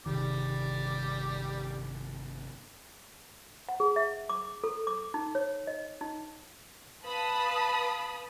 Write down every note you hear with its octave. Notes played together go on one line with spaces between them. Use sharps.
G1 C3 D#3 G3 D6
F#5
G#4
E5
D6
A4
D6
D#4
C#5
D#5
D#4
B4 F5 A5 B5 D#6